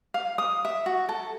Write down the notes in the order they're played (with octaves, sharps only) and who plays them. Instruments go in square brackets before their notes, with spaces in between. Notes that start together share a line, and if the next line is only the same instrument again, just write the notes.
[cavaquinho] F5
D#6
E5
F#4
A4